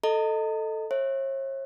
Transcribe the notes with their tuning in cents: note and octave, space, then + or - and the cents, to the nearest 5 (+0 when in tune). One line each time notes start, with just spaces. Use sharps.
A4 +0 D#5 +0 A#5 -45
C#5 -45 E5 +0